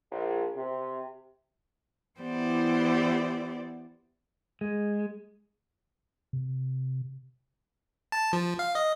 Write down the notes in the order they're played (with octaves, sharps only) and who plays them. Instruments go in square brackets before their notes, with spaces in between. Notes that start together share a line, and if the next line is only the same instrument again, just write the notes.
[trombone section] A#1
C3
[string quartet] E3 B3 E4 G4 C5 D5
[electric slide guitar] G#3
[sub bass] C3
[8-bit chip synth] A5
F3
F5
D#5